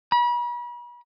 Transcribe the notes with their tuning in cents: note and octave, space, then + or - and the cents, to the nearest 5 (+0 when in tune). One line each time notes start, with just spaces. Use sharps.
B5 -40